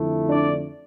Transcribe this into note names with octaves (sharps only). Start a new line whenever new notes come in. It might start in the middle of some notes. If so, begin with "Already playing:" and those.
Already playing: F2 D3 A3 E4
D4 D5